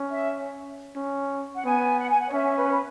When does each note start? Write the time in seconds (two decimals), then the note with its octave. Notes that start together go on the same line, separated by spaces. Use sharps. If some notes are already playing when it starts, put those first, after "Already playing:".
Already playing: C#4
0.11 E5
0.96 C#4
1.55 F#5
1.65 B3 G#5
1.99 F#5
2.09 G#5
2.20 F#5
2.29 C#5
2.33 C#4 E5
2.56 B4
2.71 B4